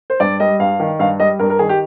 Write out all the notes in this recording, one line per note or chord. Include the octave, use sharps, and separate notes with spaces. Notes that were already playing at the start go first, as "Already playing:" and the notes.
C5
G2 D5
G3 D#5
G2 F5
D#3
G2 F5
G3 D#5
G2 A#4
A#4
D#3 G#4
G4